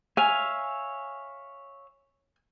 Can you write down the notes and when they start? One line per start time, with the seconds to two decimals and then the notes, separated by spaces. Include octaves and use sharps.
0.17 C#5 E5 F5 G#5